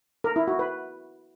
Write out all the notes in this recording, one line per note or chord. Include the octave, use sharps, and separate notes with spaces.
A#4
E4
F#4
B4